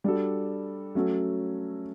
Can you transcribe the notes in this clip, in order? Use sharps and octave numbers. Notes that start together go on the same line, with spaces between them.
G3 D4 F#4 A4
F#3 A3 C#4 F#4 A4